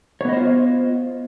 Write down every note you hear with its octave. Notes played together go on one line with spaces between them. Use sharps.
B3 F4 C5 C#5 D#5